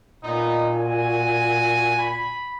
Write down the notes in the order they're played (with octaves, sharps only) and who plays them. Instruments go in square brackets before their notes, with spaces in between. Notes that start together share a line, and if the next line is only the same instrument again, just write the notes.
[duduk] A#2 [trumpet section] B3 D#4
[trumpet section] F#4 G#5
B5